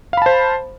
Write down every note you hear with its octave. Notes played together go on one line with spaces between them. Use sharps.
C5 F5 A5 B5